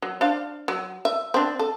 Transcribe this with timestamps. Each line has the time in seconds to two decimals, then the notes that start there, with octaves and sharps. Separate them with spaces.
0.02 F#3
0.21 D4 C5 F5
0.68 F#3
1.05 E5
1.34 C4 D4
1.59 A4